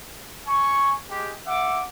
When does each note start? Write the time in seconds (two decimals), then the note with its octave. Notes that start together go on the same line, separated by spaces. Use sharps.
0.47 G#5 C#6
1.09 G#3 G4
1.47 E5 F#5 D6